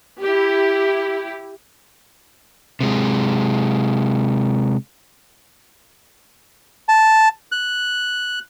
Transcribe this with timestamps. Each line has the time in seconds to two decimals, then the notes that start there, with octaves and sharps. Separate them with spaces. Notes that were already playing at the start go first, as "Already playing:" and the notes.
0.23 E4 G4
2.80 C3 G#3
6.89 A5
7.52 F#6